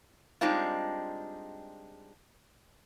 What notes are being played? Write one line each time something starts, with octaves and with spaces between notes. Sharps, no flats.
G3 G#3 C4 D4 D#4 F4